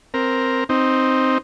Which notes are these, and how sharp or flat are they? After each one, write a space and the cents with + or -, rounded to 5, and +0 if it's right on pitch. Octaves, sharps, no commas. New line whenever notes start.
C4 +0 A#4 +0
C4 +0 D#4 +0